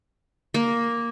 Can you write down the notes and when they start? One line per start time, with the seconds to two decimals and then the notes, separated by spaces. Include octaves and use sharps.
0.54 A#3